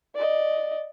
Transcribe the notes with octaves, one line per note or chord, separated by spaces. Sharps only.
D5 D#5